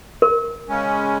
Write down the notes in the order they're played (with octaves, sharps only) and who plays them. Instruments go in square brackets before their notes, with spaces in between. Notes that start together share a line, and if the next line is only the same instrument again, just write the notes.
[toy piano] A#4
[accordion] C#3 G#3 C#4